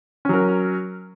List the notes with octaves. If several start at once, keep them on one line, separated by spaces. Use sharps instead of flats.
F#3 C#4 A#4